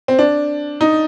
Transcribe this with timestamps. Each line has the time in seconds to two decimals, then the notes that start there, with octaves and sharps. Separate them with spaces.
0.08 C4
0.19 D4
0.81 D#4